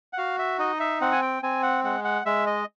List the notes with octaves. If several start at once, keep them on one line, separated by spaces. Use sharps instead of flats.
F#5
F#4 F5
E5
D#4 D#5
E5
C4 F#5
G#5
G5
C4 G#5
F#5
G#3 F#5
F#5
G#3 E5
D#5